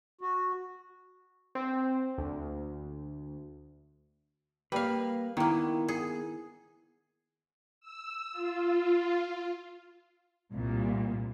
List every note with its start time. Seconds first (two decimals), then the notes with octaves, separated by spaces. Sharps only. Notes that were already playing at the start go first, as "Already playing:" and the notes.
0.21 F#4
1.55 C4
2.18 D2
4.72 G3 A#3 B4 F5
5.37 D#3 A#3 B3 E4
5.88 G#4
7.81 E6
8.32 F4
10.52 C2 A#2